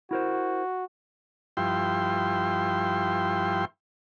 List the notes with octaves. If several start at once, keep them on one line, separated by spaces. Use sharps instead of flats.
E4 F#4 A#4 C5
G2 F3 E4 G5 C6